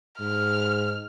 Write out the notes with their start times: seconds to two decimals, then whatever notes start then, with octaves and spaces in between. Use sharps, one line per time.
0.20 G#2 F6